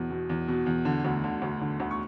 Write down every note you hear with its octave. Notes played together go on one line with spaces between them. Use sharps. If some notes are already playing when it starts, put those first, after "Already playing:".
Already playing: E2 B2
B2
E2
B2
E2
D3
D2
D3
D2
D3
D2
C#6